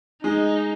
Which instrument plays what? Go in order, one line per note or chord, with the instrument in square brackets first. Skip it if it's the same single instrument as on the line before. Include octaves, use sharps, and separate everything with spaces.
[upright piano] G#3 [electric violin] D#4